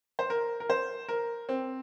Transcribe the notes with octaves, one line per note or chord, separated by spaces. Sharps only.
C5
A#4
A#4
C5
A#4
C4